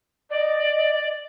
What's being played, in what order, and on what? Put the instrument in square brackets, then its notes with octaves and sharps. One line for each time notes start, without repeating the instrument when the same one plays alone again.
[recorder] D5 [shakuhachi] D#5